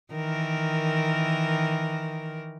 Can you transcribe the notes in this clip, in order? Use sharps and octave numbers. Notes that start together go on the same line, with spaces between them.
D#3 E3 A#4